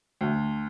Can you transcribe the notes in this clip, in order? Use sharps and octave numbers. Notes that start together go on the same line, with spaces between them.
D2